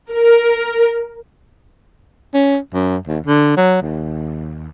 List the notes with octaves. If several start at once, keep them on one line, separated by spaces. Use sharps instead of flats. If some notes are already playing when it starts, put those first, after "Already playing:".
A#4
C#4
F#2
D#2
D3
F#3
D#2